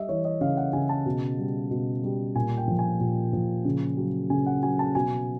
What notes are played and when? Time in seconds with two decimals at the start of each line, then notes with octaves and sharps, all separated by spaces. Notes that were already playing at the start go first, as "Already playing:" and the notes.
Already playing: G3 D#5 E5
0.09 E3 C#5
0.25 D#5
0.41 C#3 F5
0.57 F#5
0.73 C#3 G#5
0.89 A5
1.06 B2
1.38 G3
1.71 B2
2.04 G3
2.35 A#2 G#5
2.57 G5
2.68 F3
2.79 G#5
3.00 A#2
3.33 F3
3.65 C#3
3.97 F#3
4.30 C#3 G#5
4.46 F#5
4.62 F#3 G#5
4.79 A5
4.95 B2 G#5